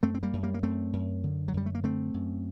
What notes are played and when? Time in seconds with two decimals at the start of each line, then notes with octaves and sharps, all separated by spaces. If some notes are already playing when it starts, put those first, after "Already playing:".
0.03 F#2 A3 C4
0.14 C4
0.23 G3 A#3
0.33 F#2
0.43 G3 A#3
0.54 A#3
0.63 F#2 A3 C4
0.93 F#2
1.24 D3
1.48 F#3
1.54 F#2 G3
1.66 A3
1.75 A#3
1.84 D3 A3 C4
2.14 F#2